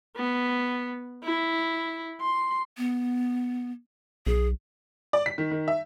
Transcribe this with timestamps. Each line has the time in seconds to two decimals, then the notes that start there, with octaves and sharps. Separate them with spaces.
0.16 B3
1.24 E4
2.21 C6
2.78 B3
4.27 B1 G#4
5.13 D5
5.26 B6
5.38 D#3
5.51 D#3
5.68 E5